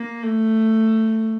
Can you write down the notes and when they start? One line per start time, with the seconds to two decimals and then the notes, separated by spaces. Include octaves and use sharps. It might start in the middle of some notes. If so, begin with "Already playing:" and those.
Already playing: A#3
0.23 A3